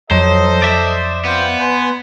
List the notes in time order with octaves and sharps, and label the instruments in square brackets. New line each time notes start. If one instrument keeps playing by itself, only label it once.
[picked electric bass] F2 [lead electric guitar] F#3 [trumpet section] A4 D#5 [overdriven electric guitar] C5
[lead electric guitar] D5 E5
[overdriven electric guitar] B3 [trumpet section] C4 F4 G5
[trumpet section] B4 G#5 C6